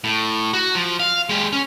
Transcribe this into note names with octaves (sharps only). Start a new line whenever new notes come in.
A2
F#4
F3
F5
G#3 G4
C#4